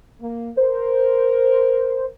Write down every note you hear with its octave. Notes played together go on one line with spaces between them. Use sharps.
A#3
A#4 C5